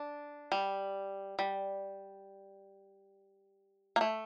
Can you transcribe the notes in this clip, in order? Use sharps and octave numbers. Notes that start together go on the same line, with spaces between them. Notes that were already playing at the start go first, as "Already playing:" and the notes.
Already playing: D4
G3
G3
A#3
A3